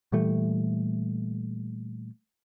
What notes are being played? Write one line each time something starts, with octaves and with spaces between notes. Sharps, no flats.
A#2 E3 G3 A3